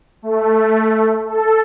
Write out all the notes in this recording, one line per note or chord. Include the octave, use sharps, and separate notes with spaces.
A3
A4